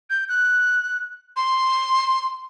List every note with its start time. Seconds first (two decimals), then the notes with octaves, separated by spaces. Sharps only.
0.10 G6
0.29 F#6
1.36 C6